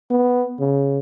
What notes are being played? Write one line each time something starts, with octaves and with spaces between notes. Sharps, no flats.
B3
C#3